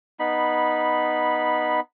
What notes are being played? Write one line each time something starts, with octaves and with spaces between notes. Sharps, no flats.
B3 D#4 B5